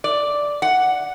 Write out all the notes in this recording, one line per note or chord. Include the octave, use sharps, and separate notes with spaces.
D5
F#5